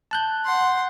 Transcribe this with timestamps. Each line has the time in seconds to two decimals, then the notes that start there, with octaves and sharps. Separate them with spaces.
0.11 A5 F#6 G6
0.45 F#5 C6